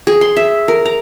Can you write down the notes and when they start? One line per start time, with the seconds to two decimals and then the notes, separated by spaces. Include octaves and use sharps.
0.07 G#4
0.21 C6
0.36 E5
0.68 A#4
0.85 A#5